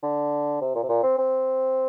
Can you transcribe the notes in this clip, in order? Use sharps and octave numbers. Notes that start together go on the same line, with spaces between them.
D3
C3
A#2
C3
A#2
C4
C4